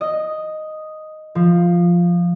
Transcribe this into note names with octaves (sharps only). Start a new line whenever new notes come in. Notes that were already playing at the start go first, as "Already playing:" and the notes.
D#5
F3